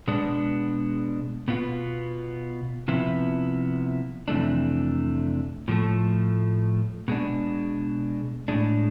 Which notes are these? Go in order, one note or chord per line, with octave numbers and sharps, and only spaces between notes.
B2 G#3 B3 D4
B2 B3 F4
C3 F3 B3 E4
F2 C3 E3 A3 D4
A2 F3 A3
B2 G#3 D4
A2 G#3 D4